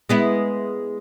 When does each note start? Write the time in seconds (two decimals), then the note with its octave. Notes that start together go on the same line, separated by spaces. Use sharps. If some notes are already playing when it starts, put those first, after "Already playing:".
0.09 G#3 B3 E4